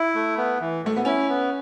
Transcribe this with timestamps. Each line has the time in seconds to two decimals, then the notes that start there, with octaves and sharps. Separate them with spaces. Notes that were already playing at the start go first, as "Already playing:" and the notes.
Already playing: E4
0.15 A3
0.37 B3
0.61 E3
0.82 A2 A3
0.96 B3
1.05 C#4 E4
1.29 B3